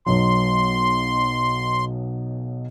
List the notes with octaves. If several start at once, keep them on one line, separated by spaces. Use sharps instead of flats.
B1 B2 F#3 C6